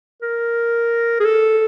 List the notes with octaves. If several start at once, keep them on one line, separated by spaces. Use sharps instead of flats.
A#4
G#4
A4